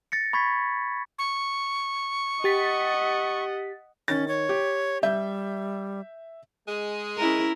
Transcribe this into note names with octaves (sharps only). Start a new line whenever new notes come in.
A6 A#6 C#7
B5 C#6 G#6 A6 B6
C#6
G4 D#5 F#5 A6 B6
D#3 C#4 A6
C#5
G4
G3 E5 G6
G#3
C#4 E4 A#4